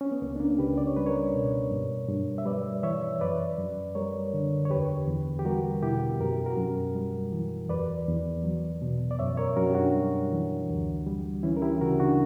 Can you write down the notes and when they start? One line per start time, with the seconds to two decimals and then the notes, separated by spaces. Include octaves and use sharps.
0.01 C#4
0.11 B3
0.22 C#2 A#3
0.36 D4
0.40 A#3 C#4
0.59 C#2 G4 B4
0.78 D5
0.87 C#5
0.96 G3 B4
1.06 A#4 C#5
1.33 B2
1.71 G2
2.09 G2
2.38 E5
2.46 G3 B4 D5
2.83 E3 C#5 E5
3.21 F#2 B4 D5
3.58 F#2
3.95 G3 A#4 C#5
4.34 D3
4.65 C#5
4.70 E2 G4 B4
5.07 E2
5.39 G4
5.45 G3 F#4 A#4
5.82 B2 E4 G4
6.20 F#2 A#4
6.33 G4
6.46 F#4 A#4
6.57 F#2
6.95 G3
7.32 E3
7.69 E2 B4 D5
8.08 E2
8.44 F#3
8.82 B2
9.11 D5
9.19 F#2 C#5 E5
9.37 A#4 C#5
9.56 F#2 F#4 A#4
9.71 G4
9.75 D4 F#4
9.94 G3
10.32 E3
10.69 D2
11.07 G3
11.43 E3 C#4 E4
11.57 A#4
11.62 E4 G4
11.81 C#3 F#4 A#4
11.99 D4 F#4